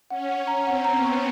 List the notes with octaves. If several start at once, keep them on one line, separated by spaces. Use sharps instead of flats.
C#4 F#5
F#5
A#5
C4 F#5
A#5
B3
C#6